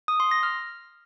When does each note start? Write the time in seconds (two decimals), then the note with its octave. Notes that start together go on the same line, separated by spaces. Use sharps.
0.08 D#6
0.20 C6
0.31 A#6
0.43 F6